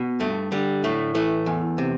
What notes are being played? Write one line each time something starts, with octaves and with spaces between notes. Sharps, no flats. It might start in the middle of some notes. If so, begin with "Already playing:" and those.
Already playing: B2
G2 A3
D3 G3
A2 A3
E3 A3
E2
C3